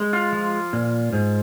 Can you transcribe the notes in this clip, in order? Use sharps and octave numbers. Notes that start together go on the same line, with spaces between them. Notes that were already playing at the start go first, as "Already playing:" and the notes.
Already playing: G#3
F4
F3
A#2
G#2